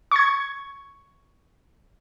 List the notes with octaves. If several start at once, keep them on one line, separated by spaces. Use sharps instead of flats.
C#6 G#6